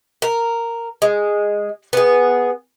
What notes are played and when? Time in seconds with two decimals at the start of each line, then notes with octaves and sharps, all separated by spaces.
0.22 A#4
1.02 G#3
1.93 B3 G#4